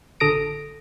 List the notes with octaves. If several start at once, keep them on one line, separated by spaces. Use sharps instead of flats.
A1 D3 A4 D#6 A#6 D7